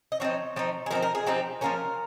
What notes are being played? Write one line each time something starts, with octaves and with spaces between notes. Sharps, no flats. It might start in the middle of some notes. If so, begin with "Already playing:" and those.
D#5
F3 C4 D#4 C#5
F3 C4 D#4
G#4
F3 C4 D#4 A#4
A#4
G#4
F3 C4 D#4 G4
F3 A#3 C#4 A#4